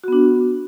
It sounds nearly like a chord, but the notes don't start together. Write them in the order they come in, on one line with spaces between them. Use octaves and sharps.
F#4 B3 D4